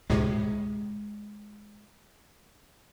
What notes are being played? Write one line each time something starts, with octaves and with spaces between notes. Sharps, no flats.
D2 A2 C3 G#3